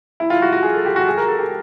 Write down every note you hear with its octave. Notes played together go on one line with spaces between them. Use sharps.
E4
F4
F#4
F#4
G#4
A4
G4
F#4
G#4
A#4
A4
G4